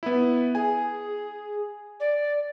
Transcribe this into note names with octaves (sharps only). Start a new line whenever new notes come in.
B3 E4
G#4 G#5
D5